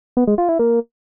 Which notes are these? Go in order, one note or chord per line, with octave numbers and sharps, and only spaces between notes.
B3
G#3
F4
E4
A#3